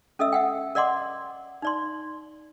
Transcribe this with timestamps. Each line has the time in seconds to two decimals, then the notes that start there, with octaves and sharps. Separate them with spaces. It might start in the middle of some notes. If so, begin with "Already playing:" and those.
0.19 C#4 A4 D#5 E5 E6
0.33 E5 F#5 G5
0.75 A#4 D5 D#5 F#5 C6 D6
1.62 D#4 D5 C6